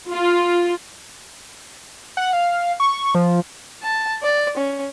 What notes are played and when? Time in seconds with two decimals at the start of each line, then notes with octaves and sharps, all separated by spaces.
0.11 F4
2.17 F#5
2.33 F5
2.80 C#6
3.15 F3
3.83 A5
4.23 D5
4.57 C#4